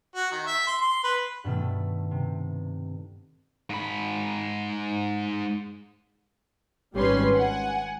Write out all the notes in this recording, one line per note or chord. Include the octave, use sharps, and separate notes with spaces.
F#4
D#3
E5
C6
C6
B4
G2 B2 D#3 A3
C3
G#2 B5
G#1 G3 C#4 B4 C6
F#5 G#5